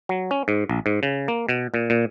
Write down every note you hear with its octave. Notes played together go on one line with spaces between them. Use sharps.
F#3
C#4
G#2
A#1
G#2
C#3
A#3
B2
A#2
A#2